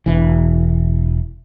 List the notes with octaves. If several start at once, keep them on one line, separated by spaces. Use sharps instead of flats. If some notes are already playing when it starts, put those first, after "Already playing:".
E1 E3